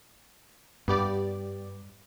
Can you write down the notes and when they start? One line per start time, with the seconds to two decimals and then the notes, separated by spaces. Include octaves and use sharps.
0.88 G2 B3 G4 D5